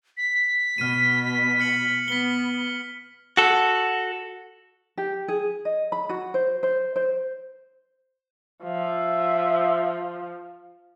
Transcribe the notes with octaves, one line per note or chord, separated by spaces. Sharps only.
B6
B2 F6 D#7
F6 C#7 F#7
B3 B6 G7
F#4 A4
G4
G#4
D#5
B5
F#4
C5
C5
C5
F3 E5